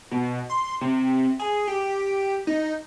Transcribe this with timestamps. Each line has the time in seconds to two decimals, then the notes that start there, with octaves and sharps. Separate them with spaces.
0.11 B2
0.50 C6
0.81 C3
1.39 G#4
1.67 G4
2.47 D#4